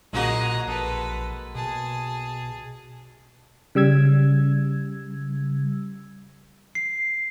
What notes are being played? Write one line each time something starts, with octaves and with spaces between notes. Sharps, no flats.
B1 A#2 G#3 A#3 F#4 D#5 A#5
A#1 A4 B4
B2 G#4 A5
C#3 G3 E6 G#6
C7